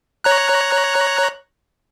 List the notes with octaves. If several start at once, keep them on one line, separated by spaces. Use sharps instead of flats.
C#5 A#5 F#6